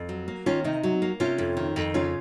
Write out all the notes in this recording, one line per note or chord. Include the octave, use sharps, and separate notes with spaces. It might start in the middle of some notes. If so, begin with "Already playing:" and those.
Already playing: F2
F#3
A#3
D#3 C#4 F4
C3 C4 D#4
F#3
A#3
C3 C#4 F4
F2
D#3
F2
C#3 C#4 F4